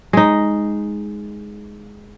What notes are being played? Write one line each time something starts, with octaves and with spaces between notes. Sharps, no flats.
G#3 D#4